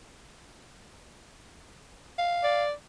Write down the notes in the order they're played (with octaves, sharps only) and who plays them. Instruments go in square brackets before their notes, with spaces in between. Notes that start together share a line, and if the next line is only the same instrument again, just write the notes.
[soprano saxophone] F5
[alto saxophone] D5